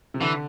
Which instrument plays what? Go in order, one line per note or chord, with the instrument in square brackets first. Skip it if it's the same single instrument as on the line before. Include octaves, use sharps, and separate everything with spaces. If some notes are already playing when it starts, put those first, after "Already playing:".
[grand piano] C3
[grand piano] D3 [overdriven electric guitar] E3